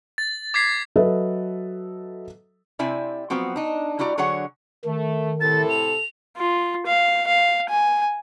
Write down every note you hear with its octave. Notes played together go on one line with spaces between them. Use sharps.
A6
D6 G#6 B6 C7
F#3 A4 B4 D#5 E5
C3 C4 E4 D5 E5 G#5
F3 F#3 B3 C4 F#4
D4 D#4
G3 E4 F#4 D5 A#5
D3 F#3 G#4 C#5 F#5
D#3 A3
A2 C3 E4 A4 A6
F7
F4
F5
F5
G#5